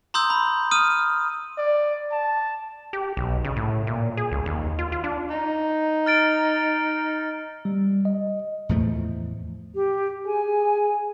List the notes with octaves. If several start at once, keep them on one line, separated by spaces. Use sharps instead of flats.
A#5 C6 D#6 E6 G6
B5
D#6 F6 D#7
D5
A5
G4
B1
C#3
A2
A#2
G#4
C#2
D#2
F4
F4
D4
D#4
F6 A6 D7
G3
D#5
E2 A2 F3 A3
G4
G#4 G#5